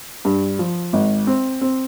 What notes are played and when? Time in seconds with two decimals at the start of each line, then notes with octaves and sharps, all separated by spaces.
0.25 G2
0.59 F3
0.93 G#1
1.27 C4
1.61 C4